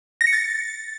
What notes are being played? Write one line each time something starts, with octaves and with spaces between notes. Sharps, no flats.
A#6
C#7
A6